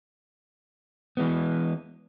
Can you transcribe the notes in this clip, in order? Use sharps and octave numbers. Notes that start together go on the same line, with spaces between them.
E3 G#3 B3